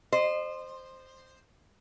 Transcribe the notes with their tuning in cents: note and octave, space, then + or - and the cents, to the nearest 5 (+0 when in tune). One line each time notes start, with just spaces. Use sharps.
C5 +0 D#5 -35